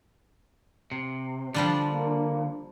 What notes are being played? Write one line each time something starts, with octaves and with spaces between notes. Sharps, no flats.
C3
D3 F3 G3 D4
A#3